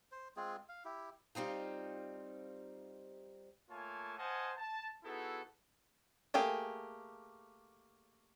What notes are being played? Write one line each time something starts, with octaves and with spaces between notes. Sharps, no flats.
C5
G#3 C4 F4 G#4
F5
E4 G4
G3 C4 D#4 F4
A3 A#3 F4 C#5 G#5 A5
C5 D#5 F5 F#5 G#5 A5
A5
B3 D#4 E4 F#4 G#4 A4
A3 A#3 G4 G#4